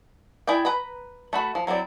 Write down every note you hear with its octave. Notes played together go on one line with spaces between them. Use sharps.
E4 G#4 D5 G5
B4 A#5 B5
A3 F#4 B5
F3
F#3 C4 E4 D5